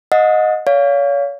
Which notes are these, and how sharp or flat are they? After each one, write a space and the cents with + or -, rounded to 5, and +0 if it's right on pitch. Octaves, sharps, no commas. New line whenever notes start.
D#5 +0 F#5 -30 D#6 +30
C#5 +35 F5 +0